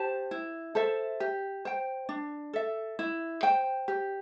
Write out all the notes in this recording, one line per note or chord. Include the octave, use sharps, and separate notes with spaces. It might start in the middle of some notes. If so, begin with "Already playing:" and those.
Already playing: G4 C5 A5
E4
A4 C5 E5
G4
C5 G5
D4
A4 E5
E4
C5 G5
G4